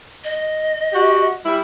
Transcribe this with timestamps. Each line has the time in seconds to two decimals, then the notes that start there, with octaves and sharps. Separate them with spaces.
0.24 D#5
0.92 F#4 G4
1.44 G3 E4